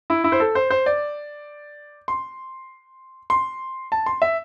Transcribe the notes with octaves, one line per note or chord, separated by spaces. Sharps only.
E4
E4
C5
A4
C5
C5
D5
C6
C6
A5
C6
E5